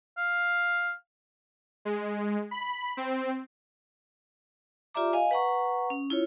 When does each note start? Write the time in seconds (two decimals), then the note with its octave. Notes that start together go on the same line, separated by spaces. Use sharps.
0.17 F5
1.85 G#3
2.51 B5
2.97 C4
4.94 F4 G4 D5 E5 A#5 D6
5.13 D#5 F5 G#5
5.31 B4 F#5 A#5 C#6
5.90 C#4
6.10 E4 F4 C#5